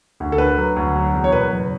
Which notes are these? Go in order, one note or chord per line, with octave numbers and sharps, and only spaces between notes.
D2
A4
D3 B4
F#3
D2
F#3
E2
C#5
B2 B4
F#1